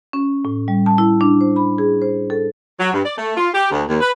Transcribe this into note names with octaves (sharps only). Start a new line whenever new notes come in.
C#4
A2
G3
A5
E4
D4
C5
B5
G#4
C5
A4
F#3
G2
D5
A3
F4
G4
D2
D#2
B4